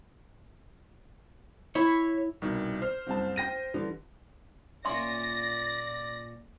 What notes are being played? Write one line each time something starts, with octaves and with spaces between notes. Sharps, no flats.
E4 C#5
C2 B2 D#3
C5 F6
F#1 C2 A5
G5 A#6 D#7
D3 E3 G3
A#2 C#4 D5 E5 C6 A#6